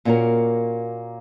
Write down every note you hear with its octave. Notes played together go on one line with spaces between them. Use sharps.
A#2 A#3 C#4 F#4 A#4